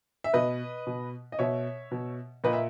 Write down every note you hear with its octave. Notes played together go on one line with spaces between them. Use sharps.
E5
B2 B4 D#5
B2
D#5
B2 C#5 E5
B2
A#2 B4 D#5
E5